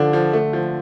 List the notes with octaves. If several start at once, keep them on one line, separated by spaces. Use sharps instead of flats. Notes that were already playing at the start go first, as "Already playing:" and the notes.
Already playing: D3 F3 D4
F3
A3
F3